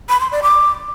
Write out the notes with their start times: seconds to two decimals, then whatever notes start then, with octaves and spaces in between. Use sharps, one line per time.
0.09 B5
0.20 C6
0.32 D5
0.43 D6